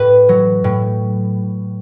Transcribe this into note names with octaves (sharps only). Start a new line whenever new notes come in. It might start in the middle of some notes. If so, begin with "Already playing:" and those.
Already playing: A2 B4
F#3
A2